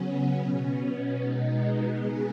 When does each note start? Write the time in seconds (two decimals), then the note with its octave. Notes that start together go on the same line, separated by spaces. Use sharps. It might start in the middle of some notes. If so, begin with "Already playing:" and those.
Already playing: C#3 F#3 B3 C#4
0.38 B2 B3 C#4
1.17 B2 G#3 B3 D#4
1.95 C#3 G#3 B3 G#4